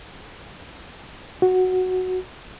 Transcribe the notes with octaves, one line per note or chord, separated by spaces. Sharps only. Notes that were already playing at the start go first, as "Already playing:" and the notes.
F#4